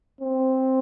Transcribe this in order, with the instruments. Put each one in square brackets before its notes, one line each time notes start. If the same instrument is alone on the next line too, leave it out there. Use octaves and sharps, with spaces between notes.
[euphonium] C4